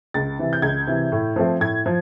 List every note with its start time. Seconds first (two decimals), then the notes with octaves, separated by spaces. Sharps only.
0.14 C#2 A6
0.39 C3 E3
0.53 G6
0.62 C#2 G#6
0.87 C3 E3
1.12 A2
1.36 F3 A3 C4
1.60 A2 G#6
1.86 F3